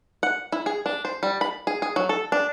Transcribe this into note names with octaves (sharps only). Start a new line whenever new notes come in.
F#5
E4
G#4
D4
C5
G3
B5
G#4
G#4
F#3
A4
D4